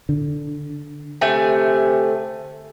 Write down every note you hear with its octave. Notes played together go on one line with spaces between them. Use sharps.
D3
C3 A3 G#5